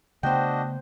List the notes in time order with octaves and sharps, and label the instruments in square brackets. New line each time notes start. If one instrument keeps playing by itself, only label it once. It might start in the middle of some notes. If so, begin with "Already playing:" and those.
[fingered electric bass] C#3 A3 B3 [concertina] D4 F#4 D#5 [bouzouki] C5 G5